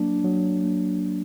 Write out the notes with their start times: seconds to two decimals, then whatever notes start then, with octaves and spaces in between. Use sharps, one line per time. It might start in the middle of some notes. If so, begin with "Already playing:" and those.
Already playing: F#3 A#3 D4
0.24 F#3
0.63 A#3 D4
1.02 F#3